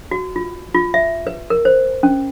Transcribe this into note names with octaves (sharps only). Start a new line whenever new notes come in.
F#4
F4
F4
E5
B4
A#4
C5
C#4